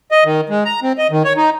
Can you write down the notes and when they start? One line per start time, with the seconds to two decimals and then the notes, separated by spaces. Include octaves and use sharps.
0.11 D#5
0.25 D#3
0.49 G#3
0.65 A#5
0.83 C4
0.98 D#5
1.11 D#3
1.25 C#5
1.37 D#4